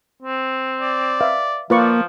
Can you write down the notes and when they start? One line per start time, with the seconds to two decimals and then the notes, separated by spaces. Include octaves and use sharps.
0.22 C4
0.81 D5
1.21 B4 E5 F5
1.70 F3 A#3 F4 B4 D5 C#6